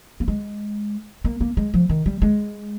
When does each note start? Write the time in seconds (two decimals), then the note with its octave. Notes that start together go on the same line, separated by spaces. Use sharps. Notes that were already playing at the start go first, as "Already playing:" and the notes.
0.20 A#3
0.28 G#3
1.24 A#3
1.41 A#3
1.57 G#3
1.74 F3
1.90 D#3
2.06 G3
2.22 G#3